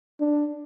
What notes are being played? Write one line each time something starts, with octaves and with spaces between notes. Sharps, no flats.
D4